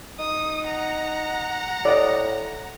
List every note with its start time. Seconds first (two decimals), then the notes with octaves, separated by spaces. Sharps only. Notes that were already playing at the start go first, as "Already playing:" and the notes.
0.19 D#4 D#6
0.65 F#5 A#5
1.85 A2 D5 D#5